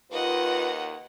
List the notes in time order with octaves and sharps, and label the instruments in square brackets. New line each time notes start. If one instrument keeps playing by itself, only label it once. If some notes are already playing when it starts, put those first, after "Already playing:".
[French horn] D#2 [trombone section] F4 B4 [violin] D#5 F#5